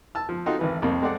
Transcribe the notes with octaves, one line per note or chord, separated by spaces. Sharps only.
A5 E6
F3
C4 D#4 F4 F#4 A4
G#1 E3 B4
C2 F2 A#3
G#3 C4 A4 D5 F#5